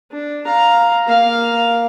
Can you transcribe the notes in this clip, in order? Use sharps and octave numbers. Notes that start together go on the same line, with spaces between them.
D4
F5 A#5
A#3 F5